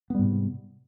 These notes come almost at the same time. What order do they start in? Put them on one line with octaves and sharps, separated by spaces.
B3 G3 G#2 C3